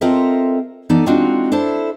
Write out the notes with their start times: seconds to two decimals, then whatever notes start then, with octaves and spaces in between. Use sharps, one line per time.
0.01 C4 F4 A4 A#4 D#5 E5
0.89 E3 B3 D#4 A4 D5
1.06 G#3 C4 D4 D#4 F4 F#4
1.52 D4 E4 A4 C5